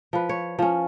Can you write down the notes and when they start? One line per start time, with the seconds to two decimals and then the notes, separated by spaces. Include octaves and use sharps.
0.13 F3 B4
0.29 C#5
0.59 F3 C#4